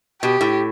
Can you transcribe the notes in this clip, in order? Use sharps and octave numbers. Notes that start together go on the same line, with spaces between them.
B2 G4
A2